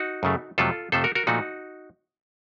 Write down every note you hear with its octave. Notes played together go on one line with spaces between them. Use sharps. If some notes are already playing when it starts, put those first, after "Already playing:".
Already playing: D#4 F#4
F#2 C#3 A3
F2 C3 F#3 A3 F4 A4
F2 C3 F3 A3 A4 C5
F#4 A#4
F#4 A#4
A#2 F3 A3 D#4 F#4